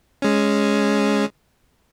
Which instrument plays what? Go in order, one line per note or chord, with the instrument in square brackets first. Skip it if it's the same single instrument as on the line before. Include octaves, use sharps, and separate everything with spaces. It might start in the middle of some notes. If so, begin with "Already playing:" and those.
[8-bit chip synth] G#3 C#4